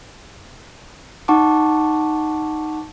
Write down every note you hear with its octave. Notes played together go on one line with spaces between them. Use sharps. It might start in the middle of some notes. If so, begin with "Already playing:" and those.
D#4 F#5 A5 C#6 D6